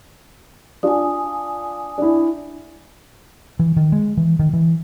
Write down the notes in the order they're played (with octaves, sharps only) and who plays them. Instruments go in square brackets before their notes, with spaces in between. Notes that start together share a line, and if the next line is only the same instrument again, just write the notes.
[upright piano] D4 F4 [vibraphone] G#5 D#6
[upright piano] D4 E4
[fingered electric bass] E3
D#3
G#3
E3
D#3
E3